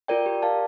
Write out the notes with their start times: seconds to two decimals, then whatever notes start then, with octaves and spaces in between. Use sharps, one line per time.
0.08 F4 A#4 D5 G5
0.26 G4
0.42 A#4 D5 F5 A5